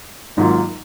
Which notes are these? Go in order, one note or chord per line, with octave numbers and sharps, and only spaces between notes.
G#1 G#2 F#3 A#3 F4